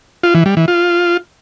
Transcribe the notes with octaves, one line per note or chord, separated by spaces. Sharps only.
F4
E3
G3
E3
F4